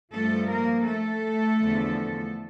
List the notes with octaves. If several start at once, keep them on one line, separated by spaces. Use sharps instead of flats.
G2 F3 A3 A4
A#3 A#4
A3 A4
E2 D3 F3